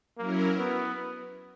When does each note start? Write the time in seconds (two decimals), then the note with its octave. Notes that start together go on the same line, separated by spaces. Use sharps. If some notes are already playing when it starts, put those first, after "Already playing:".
0.17 F#3 A#3 C#4 E4 A#4
0.57 B3